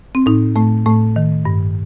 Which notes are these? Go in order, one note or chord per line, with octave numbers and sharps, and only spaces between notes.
C4
A2 D#4
A2 A3
A2 A3
D#3
G2